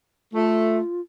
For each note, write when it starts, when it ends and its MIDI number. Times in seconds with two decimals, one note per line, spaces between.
0.34 0.78 57
0.34 1.01 65